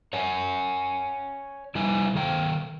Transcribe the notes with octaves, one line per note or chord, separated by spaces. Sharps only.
C#5 F#5 G#5
C3 G3 E4 B4 G#5
D#3 A4 F5 G5